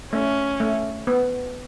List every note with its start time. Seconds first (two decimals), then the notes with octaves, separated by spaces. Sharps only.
0.12 A3 C#4
0.60 A3
1.07 B3